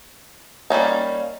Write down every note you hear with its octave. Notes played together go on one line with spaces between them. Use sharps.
G3 A#3 C#4 D#4